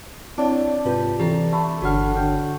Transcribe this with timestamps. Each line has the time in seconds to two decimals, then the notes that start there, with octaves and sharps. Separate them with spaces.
0.38 C4 D4 E4 C#5
0.85 G#2 C3 F4 G4 B4
1.20 E3 C4 G4 A4 A#5
1.52 A3 B5
1.82 G1 D3 F#4 C#5 F#5 F6
2.15 D3 G5